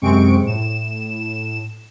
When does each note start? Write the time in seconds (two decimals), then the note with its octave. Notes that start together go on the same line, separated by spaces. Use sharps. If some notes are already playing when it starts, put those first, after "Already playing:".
0.02 F#2 C3 G#3 C4 C#6 D7
0.45 A2 E7